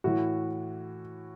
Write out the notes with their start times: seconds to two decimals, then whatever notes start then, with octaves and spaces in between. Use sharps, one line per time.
0.04 A2 E3 F#4